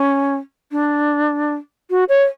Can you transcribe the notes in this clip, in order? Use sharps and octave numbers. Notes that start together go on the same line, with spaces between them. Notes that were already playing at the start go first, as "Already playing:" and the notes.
Already playing: C#4
D4
F#4
C#5